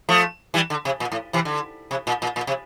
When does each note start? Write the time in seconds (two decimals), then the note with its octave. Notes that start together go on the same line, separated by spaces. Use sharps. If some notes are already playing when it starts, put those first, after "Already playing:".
0.09 F3 A3
0.54 E3 G3
0.70 D3
0.85 C3
1.00 A#2
1.12 A2
1.33 C3 E3
1.45 D3
1.91 C3
2.07 A#2
2.22 A#2
2.36 A#2
2.47 C3